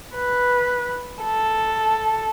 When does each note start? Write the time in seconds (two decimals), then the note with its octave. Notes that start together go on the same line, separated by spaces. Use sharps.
0.15 B4
1.23 A4